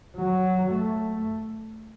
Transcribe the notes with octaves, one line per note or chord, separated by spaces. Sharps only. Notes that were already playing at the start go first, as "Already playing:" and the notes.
F#3
A3